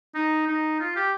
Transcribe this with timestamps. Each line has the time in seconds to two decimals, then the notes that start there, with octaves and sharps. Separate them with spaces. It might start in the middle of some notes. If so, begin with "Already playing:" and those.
0.15 D#4
0.47 D#4
0.80 F4
0.96 G4